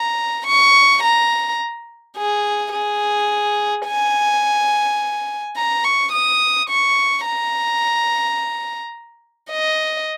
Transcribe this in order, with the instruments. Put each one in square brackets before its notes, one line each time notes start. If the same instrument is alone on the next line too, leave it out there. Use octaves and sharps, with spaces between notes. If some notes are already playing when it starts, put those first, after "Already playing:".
Already playing: [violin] A#5
C#6
A#5
G#4
G#4
G#5
A#5
C#6
D#6
C#6
A#5
D#5